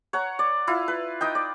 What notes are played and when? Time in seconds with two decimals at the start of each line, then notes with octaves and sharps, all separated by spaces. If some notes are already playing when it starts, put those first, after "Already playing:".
0.13 C#5 F#5 A#5
0.39 D5
0.67 E4 F4
0.88 B4
1.21 D#4 D#5 G5
1.35 D5